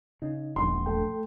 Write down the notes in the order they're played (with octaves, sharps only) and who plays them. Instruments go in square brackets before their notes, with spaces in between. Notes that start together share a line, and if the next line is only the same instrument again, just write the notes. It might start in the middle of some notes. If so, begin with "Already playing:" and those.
[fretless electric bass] C#3 [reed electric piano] D#4
[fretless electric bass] E1 A#1 [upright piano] C6
[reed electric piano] A3 A4 G5